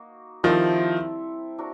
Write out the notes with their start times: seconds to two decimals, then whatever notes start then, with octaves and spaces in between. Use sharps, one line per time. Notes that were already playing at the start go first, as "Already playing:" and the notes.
Already playing: A#3 D#4 F#4
0.43 D#3 F3 G3 C4 E4 A4
1.58 D4 F#4 A#4